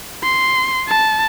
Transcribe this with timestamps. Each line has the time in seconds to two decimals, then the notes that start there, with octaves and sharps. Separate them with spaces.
0.23 C6
0.88 A5